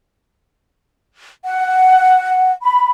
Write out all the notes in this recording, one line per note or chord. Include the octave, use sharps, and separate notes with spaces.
F#5
B5